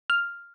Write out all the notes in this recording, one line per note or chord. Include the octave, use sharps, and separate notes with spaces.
F6